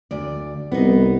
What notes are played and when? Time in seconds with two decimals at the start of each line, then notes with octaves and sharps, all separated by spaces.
0.11 D2 D5
0.72 C2 B3 D#4